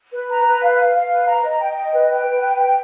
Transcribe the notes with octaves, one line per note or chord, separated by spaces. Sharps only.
B4
A#5
B4
F5
F5
F5
B4
A#5
D#5
G5
D#5
B4
G5
B4
G5
G5